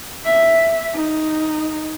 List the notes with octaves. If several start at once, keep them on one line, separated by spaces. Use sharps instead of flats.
E5
D#4